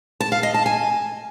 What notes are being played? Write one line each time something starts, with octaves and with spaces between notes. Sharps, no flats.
A5
F5
D#5
A5
G#5